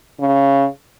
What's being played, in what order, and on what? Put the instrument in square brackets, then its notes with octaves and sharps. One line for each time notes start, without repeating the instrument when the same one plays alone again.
[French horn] C#3